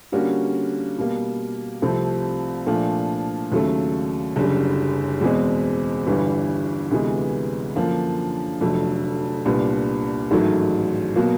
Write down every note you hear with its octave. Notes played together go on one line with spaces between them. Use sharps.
D3 G3 A#3 C#4 F#4
B2 G3 A#3
C2 C3 F3 A3 C4
A#2 F3 A3 D4 F4
D#2 C#3 F#3 A3
F#1 F#2 D3 G3
E2 B2 G#3 C4
G1 G2 E3 G3
D2 C3 E3 G#3 B3
F#2 D3 F3 A#3 D4
F1 F2 D3 F#3 A3
C2 A#2 G3 B3 D4
A1 G#2 D#3 F#3 A3
B2 F#3 A#3